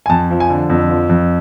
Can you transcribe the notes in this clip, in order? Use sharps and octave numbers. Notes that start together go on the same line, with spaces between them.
G#5
F2 A5
F3
G#5
D3
F2
F3
F2